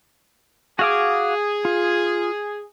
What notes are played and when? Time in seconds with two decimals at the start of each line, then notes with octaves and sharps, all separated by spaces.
0.79 F#4 G#4 F5 D6
1.65 F4